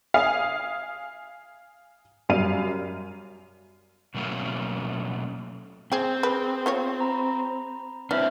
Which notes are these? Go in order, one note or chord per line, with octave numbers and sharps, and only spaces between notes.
F5 G#5 D#6
F#2 G3 F5 D#7
B2 F#3 A3 A#3 C#4
C4 G#4 G5
G#4 B4
B3 F4 C#5
A#5 B5
E3 C4 D4 E5 F6